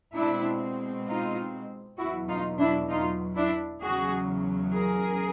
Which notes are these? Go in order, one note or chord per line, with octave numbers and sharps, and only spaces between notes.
B2 G#3 C4 D4 E4
D#4 F4
E2 B2 F#3 E4 F#4
D#4 F4
D4 E4
D#4 F4
D4 E4
E2 C#3 F#3 F#4 G#4
G#4 A#4